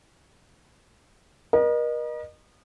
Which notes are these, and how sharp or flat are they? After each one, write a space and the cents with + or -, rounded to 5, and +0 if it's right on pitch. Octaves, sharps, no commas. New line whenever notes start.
A#4 +40 D#5 -30